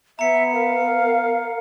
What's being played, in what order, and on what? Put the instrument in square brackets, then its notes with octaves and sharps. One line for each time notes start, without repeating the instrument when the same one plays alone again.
[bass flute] B3 [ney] E5 [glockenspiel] A#5 C#7
[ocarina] A#4 [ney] F5